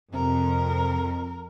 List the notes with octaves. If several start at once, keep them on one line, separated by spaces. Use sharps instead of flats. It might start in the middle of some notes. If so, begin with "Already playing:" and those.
F2 C3 A#4